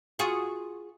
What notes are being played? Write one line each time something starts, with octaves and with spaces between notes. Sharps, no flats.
F4 F#4 G#4